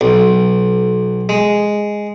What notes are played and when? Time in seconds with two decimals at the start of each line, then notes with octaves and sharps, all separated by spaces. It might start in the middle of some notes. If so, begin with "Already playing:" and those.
0.01 B1
1.29 G#3